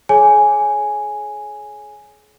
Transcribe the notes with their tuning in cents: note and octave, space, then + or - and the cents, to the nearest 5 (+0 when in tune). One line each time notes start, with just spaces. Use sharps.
G#4 +35 C#5 +0 G#5 +0